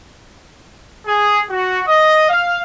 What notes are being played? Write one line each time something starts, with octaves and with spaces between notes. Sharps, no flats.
G#4
F#4
D#5
F5